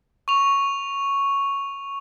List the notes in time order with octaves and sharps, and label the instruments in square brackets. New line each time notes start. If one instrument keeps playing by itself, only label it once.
[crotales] C#6 F7